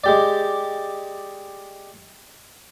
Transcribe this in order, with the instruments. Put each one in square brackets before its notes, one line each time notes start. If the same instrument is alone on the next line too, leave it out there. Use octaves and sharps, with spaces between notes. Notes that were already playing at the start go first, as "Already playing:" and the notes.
[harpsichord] G#3 G4 D5